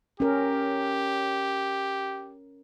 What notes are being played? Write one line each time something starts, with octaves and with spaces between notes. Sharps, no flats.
C#4 G4 A#4